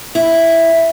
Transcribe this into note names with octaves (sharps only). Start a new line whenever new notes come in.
E4